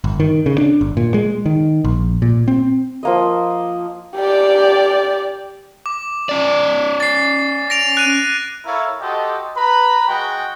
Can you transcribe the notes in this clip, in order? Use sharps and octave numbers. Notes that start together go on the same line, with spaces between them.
G1
D#3
C#3
D4
G1
A#2
G#3
D#3
A#1
A#2
C4
F3 A#3 D#5
G4 D5
D6
C#4 D5
A6 C7
A#6 D7 F7
F#6 D#7
E4 A4 A#4 C#5 F5 B5
F#4 G4 A4 C5 D#5
B4 A#5 B5
G#3 F#4 G5